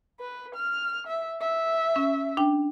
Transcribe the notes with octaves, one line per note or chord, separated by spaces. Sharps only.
B4
F6
E5
E5
C#4
D4 G5